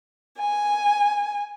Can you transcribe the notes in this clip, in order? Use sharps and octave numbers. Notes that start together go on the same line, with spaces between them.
G#5